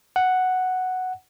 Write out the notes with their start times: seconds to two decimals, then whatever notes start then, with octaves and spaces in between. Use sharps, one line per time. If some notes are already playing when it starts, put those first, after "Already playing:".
0.16 F#5